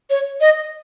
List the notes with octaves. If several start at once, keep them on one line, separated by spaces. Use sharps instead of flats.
C#5
D#5